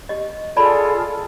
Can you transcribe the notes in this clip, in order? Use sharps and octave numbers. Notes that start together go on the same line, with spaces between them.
G4 D#5
F4 G#4 A4 D5 A5 B5